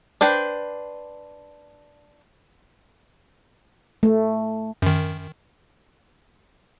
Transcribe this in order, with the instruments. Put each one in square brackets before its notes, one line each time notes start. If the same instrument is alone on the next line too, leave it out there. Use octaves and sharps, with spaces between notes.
[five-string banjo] D4 B4 C5 G5
[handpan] A3
[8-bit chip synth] F#2 D#3